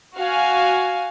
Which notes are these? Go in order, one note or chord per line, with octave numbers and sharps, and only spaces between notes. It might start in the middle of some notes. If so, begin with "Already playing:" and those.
F#4 F5 G#5